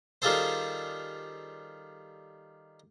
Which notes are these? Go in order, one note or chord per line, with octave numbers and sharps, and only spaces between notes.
D#3 G3 F4 G#4 A4 C5